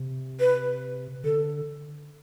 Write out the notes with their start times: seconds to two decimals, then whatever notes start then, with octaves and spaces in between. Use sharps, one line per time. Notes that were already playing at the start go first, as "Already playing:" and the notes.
Already playing: C3
0.40 B4
1.24 D3 A4